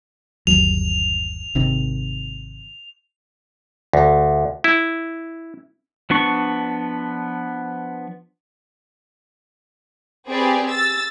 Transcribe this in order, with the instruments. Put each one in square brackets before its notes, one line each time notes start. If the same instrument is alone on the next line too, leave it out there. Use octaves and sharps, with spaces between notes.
[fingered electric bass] G1 D#2 F#3 [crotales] F7
[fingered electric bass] G#1 C3 D#3
[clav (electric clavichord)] D2
E4
[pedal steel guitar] F3 B3 D4 C#6
[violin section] C4 G4 G#4 B4 D5
E6 A6